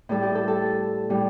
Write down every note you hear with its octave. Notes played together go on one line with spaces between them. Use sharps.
A2 G3 A4
G4
A4
A4
A2 G3